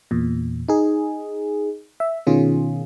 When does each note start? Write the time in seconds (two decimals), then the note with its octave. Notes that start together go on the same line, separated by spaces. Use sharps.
0.11 E2 A#2
0.68 D#4 G#4
2.00 E5
2.27 B2 D#3 C#4 F4 G#4